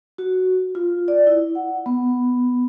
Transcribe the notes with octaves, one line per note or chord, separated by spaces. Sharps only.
F#4
F4
D5
E4
F#5
B3